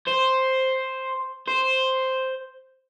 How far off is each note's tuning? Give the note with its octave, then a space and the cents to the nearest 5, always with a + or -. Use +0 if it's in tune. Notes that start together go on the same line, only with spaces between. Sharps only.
C5 +5
C5 +0